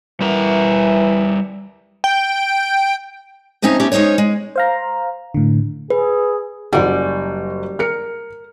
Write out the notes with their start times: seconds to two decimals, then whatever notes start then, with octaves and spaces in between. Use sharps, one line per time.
0.21 E3 G3 A#4
2.04 G5
3.62 F3 A3 C4 C#4 D#4
3.80 A3 B3 C#4 E4 G4
3.92 G#3 C#4 D#4 C5 C#5
4.18 G#3
4.56 C5 F5 A#5
5.34 A2 D3
5.90 G#4 B4
6.73 F#1 G3 F#4 F#5 G#5
7.79 A#4 F6 C#7